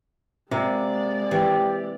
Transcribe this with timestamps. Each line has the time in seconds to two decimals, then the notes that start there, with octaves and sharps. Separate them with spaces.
0.51 C3 G#3 A#3 D5
1.31 E3 G4